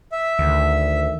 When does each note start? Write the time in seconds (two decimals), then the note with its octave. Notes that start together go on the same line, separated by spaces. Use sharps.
0.12 E5
0.39 D2 D#3